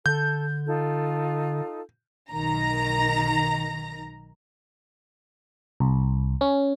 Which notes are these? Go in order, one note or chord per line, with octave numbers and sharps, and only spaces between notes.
D3 A4 G6
D#4 F4 A4
B1 D#3 A#5 A#6
C2
C#4